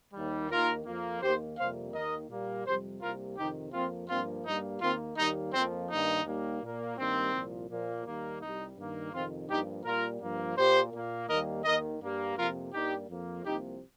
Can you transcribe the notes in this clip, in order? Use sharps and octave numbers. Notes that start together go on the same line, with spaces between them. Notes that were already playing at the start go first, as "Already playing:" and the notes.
D#2 D#3 G3
D#2 D#3 A#3 F4 A#4
F2 F3 A#3
D#2 D#3 A#3 G4 C5
F2 C3 G3 A#3 C5 F5
D#2 D#3 A#3 A#4 D#5
A#2 G3 A#3
F2 C3 G3 G4 C5
C2 C3 G3 A#3 F4 A#4
F2 C3 D#3 D#4 G4
F2 F3 A#3 C4 F4
G2 F3 A#3 C4 F4
G2 G3 A#3 D#4
D#2 D#3 A#3 C4 F4
D#2 D#3 G3 A#3 D#4
F2 F3 A#3 C4
G2 D#3 A#3 D#4
D#2 D#3 G3 A#3
A#2 A#3
G2 D#3 G3 A#3 C4
C2 A#2 F3
A#2 F3 A#3
D#2 D#3 G3 A#3
C2 C3 G3 D#4
G2 D#3 A#3
F2 C3 D#3 C4 F4
G2 F3 A#3 D#4 G4
A#2 G3 A#3 F4 A#4
G2 F3 A#3
A#2 A#3 G4 C5
A#2 A#3
D#2 D#3 G3 A#3 A#4 D#5
D#2 D#3 A#3 A#4 D#5
G2 G3 A#3
F2 C3 F3 A#3 F4 A#4
G2 G3 A#3 D#4 G4
F2 F3 A#3
C2 C3 F3 A#3 D#4 G4